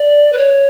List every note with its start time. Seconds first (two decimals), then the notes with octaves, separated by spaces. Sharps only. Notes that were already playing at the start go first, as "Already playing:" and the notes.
Already playing: D5
0.32 B4
0.38 C#5